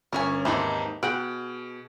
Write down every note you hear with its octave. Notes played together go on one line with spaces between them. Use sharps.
G1 C#4 A#4 C#5 G#5
D#2 G#2 E3 C4 D#4 E4
B2 G#4 F#5 G5 D7